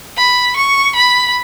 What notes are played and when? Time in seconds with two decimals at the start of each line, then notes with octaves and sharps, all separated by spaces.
0.17 B5
0.56 C#6
0.95 B5